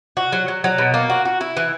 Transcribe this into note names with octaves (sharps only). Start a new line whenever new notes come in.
F#4
F#3
F#3
F#3
B2
A#3
F#4
F#4
E4
E3